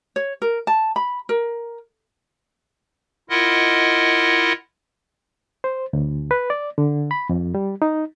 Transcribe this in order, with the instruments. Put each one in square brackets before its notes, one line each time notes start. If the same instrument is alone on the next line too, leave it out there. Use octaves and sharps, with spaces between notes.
[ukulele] C#5
A#4
A5
B5
A#4
[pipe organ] E4 F4 A#4 D#5 F#5
[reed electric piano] C5
D2
B4
D5
D3
B5
F2
G3
D#4